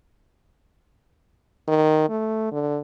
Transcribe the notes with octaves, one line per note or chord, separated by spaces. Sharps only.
D#3
A3
D3